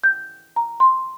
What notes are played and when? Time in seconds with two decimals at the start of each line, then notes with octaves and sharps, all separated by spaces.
0.04 G6
0.56 A#5
0.80 C6